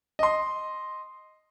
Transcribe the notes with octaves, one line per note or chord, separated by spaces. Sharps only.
D#5 C6